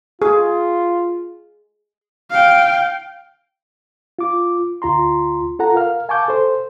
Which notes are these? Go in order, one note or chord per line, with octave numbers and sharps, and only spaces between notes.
F4 G#4
F5 G5
F4 D6
D2 F4 A#5 C6
F4 A4 F#5 A#5
A#4 F5 F6
F5 G#5 A5 C#6 D6 G6
A4 C5